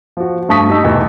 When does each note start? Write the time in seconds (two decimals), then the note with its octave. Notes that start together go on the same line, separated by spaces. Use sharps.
0.17 F3 F#4
0.49 G2 A3 A5 C#6 D#6 B6
0.70 G3 D#4 E6
0.84 E2 B2 A3 G4